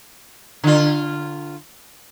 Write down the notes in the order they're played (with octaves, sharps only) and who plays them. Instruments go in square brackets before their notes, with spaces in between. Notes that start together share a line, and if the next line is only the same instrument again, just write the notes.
[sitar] D3 F4